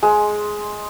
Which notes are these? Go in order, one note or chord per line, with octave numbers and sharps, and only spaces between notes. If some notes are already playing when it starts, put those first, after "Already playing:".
G#3